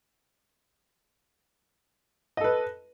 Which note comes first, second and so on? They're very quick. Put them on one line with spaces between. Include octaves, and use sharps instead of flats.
D#5 A4 B4